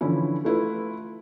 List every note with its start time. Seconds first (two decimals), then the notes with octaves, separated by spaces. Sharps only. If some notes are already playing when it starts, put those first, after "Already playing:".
0.01 D3 E3 F3 C#4 E4
0.45 A3 E4 F4 B4